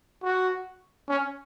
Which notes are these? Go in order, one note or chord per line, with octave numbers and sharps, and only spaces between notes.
F#4
C#4